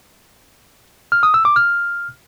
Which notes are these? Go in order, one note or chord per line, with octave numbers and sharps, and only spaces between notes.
F6
D#6
E6
D6
F6